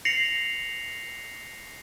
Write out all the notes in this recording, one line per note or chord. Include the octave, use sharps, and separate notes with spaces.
A#6 C7 C#7 F7 F#7